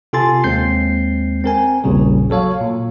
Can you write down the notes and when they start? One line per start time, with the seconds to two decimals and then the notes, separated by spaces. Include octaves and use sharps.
0.13 C3 F4 A4 G#5 C6 A6
0.44 D#2 G#3 C4 G6 C7
1.44 C4 A#4 G#5
1.84 A#1 E2 A#2 C#3 G3
2.30 F#3 A4 C#5 F5
2.61 A#2